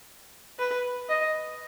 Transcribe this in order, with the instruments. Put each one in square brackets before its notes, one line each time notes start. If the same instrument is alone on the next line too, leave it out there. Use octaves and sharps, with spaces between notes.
[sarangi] B4
D#5